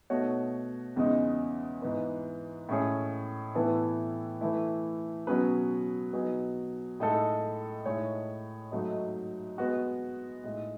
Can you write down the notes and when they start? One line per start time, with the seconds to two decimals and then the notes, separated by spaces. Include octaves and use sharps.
0.10 B2 A3 D#4 F#4 C#5
0.96 E2 C#3 G#3 D#4
1.82 G#2 E3 B3
2.69 A2 G#3 C#4 G#4 C#5
3.55 A2 E3 B3 E4 A4
4.41 E3 A3 E4
5.27 B2 F#3 C#4 G#4 B4
6.13 B2 F#3 B3 D#4 G#4
7.00 A2 G#3 D#4 A4
7.85 A2 G#3 D#4 G#4 C#5
8.72 G#2 F#3 A3 D#4
9.58 G#3 B3 F#4
10.43 A2 G#3 D#4